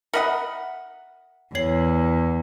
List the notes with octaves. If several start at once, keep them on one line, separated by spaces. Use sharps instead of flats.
A#4 D#5 E5 F#5 B5 C#7
E2 C#5 C7 F#7